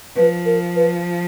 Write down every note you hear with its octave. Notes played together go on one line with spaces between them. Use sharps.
F3 B4
A#4
B4